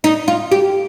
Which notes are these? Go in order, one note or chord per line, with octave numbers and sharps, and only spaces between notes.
D#4
F4
G4